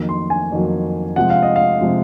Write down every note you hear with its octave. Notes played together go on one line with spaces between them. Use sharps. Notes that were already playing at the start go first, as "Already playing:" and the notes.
Already playing: F2 D#3 F#3 A#3
C6
G#5
F2 D#3 F#3 A#3
C3 F3 G#3 F#5
F5
D#5
F5
C3 F3 G#3